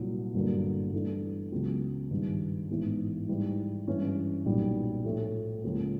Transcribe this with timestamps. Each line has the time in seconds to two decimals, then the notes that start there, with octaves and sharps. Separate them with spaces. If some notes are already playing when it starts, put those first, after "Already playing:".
Already playing: C2 A#2 F#3
0.34 G1 G2 D3 F#3 A#3
0.93 G2 E3 A3 D4
1.52 C#2 C#3 F#3 B3
2.10 G#1 G2 D#3
2.69 A1 G#2 E3 G#3 B3
3.28 G#2 E3 G3
3.88 G2 E3 G#3 C#4
4.46 B1 A#2 G3
5.05 A2 F3 A3
5.63 C#2 C#3 F3 A#3